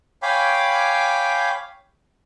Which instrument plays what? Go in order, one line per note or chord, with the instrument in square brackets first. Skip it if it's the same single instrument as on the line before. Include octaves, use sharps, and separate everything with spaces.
[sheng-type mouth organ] C#5 F5 G5 G#5 B5 D6